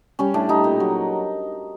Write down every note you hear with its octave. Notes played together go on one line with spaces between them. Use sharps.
G3 C#4
A2 D4
G3 D#4
A#2
F#3